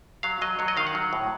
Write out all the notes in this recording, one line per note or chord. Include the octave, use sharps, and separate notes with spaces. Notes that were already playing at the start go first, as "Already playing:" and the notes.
F#3 F5
F#3 D#5
F#3 C#5
D#5
D#3 F5
F#5
F#3
A2